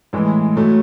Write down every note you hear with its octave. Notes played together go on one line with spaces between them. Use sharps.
A2 E3 G#3
A2 F#3 A3